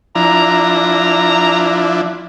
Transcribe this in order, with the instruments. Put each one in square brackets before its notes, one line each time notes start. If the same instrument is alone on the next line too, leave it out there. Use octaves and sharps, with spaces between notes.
[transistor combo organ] F3 D4 E4 [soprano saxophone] A#5